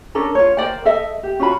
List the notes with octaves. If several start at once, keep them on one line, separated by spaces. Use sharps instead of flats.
C#4 D4 A4 A#4
F4 C#5
A#4 C5 D5 G5
A4 D#5 E5
G4
C#4 F4 F#4 B5